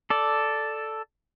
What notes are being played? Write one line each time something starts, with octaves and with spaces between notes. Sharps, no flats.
A4 D5